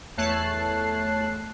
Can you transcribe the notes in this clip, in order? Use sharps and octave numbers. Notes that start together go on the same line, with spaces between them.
E2 A3 C#5 A5 F#6 C7